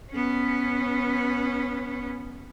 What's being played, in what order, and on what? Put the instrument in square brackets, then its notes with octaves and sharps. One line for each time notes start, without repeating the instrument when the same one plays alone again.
[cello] B3 C#4